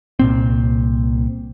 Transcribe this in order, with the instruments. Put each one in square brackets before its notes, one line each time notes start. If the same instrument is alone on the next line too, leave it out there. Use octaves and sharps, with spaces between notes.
[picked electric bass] C2 A#2 C4